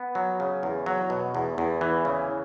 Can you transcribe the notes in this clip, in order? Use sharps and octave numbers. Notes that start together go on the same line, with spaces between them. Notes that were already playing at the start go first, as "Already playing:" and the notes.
Already playing: B3
F#3
C#3
E2
F#3
B2
E2
E2
E3
C#3